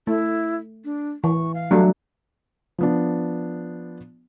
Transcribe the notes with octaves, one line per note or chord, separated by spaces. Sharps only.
A3 E4
D4
E3 C#6
F5
F#3 G3 A3 D4
F3 B3 D4